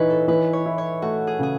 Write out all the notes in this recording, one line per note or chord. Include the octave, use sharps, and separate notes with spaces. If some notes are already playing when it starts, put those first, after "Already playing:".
Already playing: E3 D#4 B4 C#5 D#5
A4
E3 B4
C#5
E4
C#5
A3 F#4
G#4
C#3 G#4